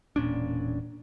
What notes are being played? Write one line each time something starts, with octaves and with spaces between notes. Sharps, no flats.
E1 A#2 C#4 D4